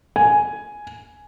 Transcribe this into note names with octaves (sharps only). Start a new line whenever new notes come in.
G#5